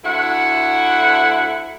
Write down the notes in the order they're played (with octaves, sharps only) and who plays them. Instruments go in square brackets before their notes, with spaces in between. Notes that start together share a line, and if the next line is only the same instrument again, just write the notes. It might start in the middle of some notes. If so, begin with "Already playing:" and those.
[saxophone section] D2 E4 F#5